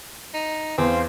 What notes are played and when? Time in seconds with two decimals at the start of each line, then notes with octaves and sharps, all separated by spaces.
0.34 D#4
0.78 E2 C4 C5 F5 C6